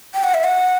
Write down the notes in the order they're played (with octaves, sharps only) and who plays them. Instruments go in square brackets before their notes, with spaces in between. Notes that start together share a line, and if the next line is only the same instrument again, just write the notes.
[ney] G5
F#5
E5
F#5